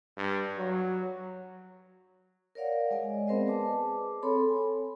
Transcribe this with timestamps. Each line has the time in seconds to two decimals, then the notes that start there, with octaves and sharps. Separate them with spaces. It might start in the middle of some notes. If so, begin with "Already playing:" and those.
0.17 G2
0.58 F#3
2.55 A#4 C#5 D5 F5 F#5
2.91 G#3 G#4 D5 D#5 G#5
3.27 B3 C4 A#4 C5 D#5
3.47 G#4 B4 A5 D6
4.23 C4 A4 C#5 B5 C6
4.49 G#5